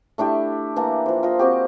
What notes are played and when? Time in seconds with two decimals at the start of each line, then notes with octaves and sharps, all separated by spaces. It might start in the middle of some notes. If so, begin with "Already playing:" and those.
0.18 A3 D4 E4 G4
0.76 E3 A#3 A5 A#5
1.06 F3 C5
1.23 F4 D#5
1.39 C4 F#4 G4